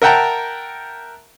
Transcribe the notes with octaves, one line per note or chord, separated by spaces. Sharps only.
A#4 E5 F#5 G5 A5 A#5